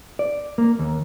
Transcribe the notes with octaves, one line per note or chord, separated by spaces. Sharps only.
D5
A#3
D#2